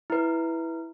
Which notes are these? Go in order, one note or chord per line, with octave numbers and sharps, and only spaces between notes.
E4 B4